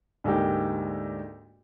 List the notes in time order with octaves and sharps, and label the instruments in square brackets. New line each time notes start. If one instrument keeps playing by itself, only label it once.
[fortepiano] D2 G#2 A#3 G4